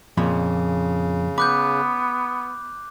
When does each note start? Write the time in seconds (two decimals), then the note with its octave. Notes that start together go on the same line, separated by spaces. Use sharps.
0.17 F2 A#2 C#3 B5
1.38 B3 B5 D6 F#6 G6